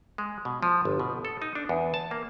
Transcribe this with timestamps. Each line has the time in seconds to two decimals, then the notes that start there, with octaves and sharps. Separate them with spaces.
0.18 G#3
0.45 B2
0.63 F3
0.85 G1
1.00 B2
1.25 A4
1.42 D#4
1.55 D4
1.69 E2
1.94 A5
2.11 A#3